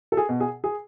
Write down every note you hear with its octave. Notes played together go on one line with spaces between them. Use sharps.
A4
G#4
B2
G#4
G#4